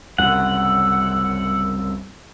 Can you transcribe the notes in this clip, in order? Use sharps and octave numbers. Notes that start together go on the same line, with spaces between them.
C2 F#2 C#3 F#5 E6